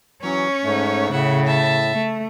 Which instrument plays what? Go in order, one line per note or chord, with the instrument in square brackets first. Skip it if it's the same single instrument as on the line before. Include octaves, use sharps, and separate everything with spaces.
[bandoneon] E3 F#3 [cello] C#4 [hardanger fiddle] C#5
[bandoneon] G#2 A3
[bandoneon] A2 [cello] C#3 [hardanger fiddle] E5 F#5
[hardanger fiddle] E5 A5
[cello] A3